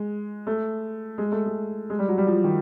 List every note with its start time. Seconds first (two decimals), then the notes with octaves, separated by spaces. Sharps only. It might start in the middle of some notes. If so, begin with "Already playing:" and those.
Already playing: G#3
0.47 A3
1.18 G#3
1.32 A3
1.46 G#3
1.90 G#3
1.99 G3
2.08 F#3
2.18 G3
2.27 F3
2.44 D#3